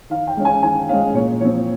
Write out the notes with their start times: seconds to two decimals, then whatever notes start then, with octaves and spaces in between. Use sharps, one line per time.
0.10 D#3 F5
0.27 G5
0.37 G#3 C#4
0.45 G#5
0.63 D#3 G#5
0.89 G#3 C#4 F5
1.14 A#2 C#5
1.41 F3 C4 C#5